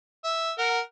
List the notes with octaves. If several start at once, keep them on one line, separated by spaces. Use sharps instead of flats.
E5
A#4 F#5